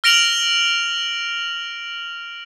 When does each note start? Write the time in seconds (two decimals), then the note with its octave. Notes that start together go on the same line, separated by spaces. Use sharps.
0.04 F6 A#6 D7 F7 F#7